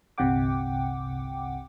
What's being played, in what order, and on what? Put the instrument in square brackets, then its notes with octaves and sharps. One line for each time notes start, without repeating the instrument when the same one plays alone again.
[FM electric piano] G1 C2 C3 F#5 G5 D6